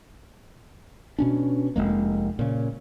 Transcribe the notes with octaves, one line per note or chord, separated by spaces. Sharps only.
B2 C#4 D4
F1 D#2 G#3 A#3
A#2 C#3